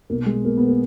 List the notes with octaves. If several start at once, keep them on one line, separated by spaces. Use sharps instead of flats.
B1 A#3
G#3
B2 A#3
B3
A#3